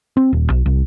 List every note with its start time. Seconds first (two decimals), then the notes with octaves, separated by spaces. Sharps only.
0.17 C4
0.33 D#1
0.50 B1
0.66 C2